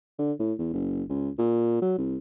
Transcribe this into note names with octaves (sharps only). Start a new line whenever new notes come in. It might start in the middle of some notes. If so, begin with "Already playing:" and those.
D3
A2
E2
F#1
C#2
A#2
F#3
C2